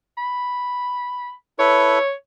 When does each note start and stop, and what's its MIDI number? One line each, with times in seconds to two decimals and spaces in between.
0.18 1.33 83
1.59 1.99 64
1.59 1.99 69
1.59 1.99 71
1.59 2.12 73